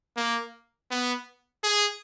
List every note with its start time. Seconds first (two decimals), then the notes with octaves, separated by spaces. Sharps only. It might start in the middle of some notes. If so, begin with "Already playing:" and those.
0.17 A#3
0.91 B3
1.64 G#4